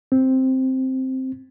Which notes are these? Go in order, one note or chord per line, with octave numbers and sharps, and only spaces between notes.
C4